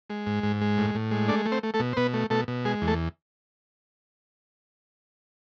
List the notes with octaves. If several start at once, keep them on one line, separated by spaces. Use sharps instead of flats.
G#3
G#2
G#2
G#3
A2
A2
G#3
A3 D4 D5
A3
C4 C5
A3
A3 A4
B2
C5
B2 B3 B4
A3
B2 A3 A4
B2
G#3 G#4
E2
A3 A4